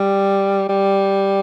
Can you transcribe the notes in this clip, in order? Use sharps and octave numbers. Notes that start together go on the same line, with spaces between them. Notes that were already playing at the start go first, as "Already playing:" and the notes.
Already playing: G3
G3